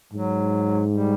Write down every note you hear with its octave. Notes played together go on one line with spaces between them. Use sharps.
G#2 F#3
G3